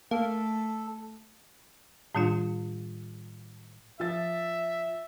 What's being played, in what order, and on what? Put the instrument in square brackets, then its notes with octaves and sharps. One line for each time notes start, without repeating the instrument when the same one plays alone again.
[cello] A3 [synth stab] A#3 [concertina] A4
[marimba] A2 D#3 G3 D4 F4
[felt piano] F3 A6 [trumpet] E5